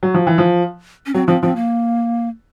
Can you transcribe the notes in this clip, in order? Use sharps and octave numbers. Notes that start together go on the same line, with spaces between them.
F#3
F3
E3
F3
C#4
F#3 C4
F3 C4
F3 C4
A#3